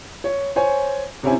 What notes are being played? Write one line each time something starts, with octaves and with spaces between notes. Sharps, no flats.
C#5
C5 C#5 G#5
C3 C4 C#4 E4 G#5